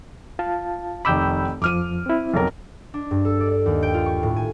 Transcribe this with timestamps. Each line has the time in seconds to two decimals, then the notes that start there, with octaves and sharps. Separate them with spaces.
0.39 F4 F5 A5
1.05 F1 D#3 B5 D6 E6 G6
1.62 F2 F3 D6 F6 D#7
2.06 C4 E4
2.34 B1 F2 A#4
2.94 D4
3.11 G2
3.25 A4
3.40 D5
3.52 D5
3.66 D#2
3.83 G5
3.94 F4
4.06 C#6
4.23 A2
4.36 G#5